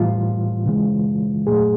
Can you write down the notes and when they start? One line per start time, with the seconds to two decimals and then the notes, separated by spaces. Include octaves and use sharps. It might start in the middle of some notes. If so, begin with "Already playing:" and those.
Already playing: A2 E3 G3 F4
0.66 C#3 E3 G#3
1.47 A#2 F#3 A3 G#4